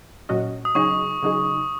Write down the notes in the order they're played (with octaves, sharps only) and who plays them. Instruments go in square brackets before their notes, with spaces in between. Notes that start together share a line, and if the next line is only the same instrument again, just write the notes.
[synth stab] A#2 F#3 C#4 F#4 D#5
[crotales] D#6
[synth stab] C#3 F#3 D#4 G#4 [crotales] C#6
[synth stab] C#3 F#3 D#4 G#4